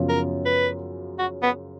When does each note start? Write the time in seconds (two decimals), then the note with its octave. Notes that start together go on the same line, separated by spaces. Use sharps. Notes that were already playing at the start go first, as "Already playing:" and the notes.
Already playing: F#2 C#3 F3 B3 F4
0.09 A#4
0.46 B4
1.19 F#4
1.43 B3